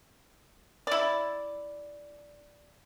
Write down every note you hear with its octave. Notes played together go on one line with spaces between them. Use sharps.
E4 D5